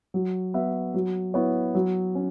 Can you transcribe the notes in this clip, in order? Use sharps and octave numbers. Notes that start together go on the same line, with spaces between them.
F#3
B3 F#4 E5
F#3
B3 E4 C#5
F#3
C#4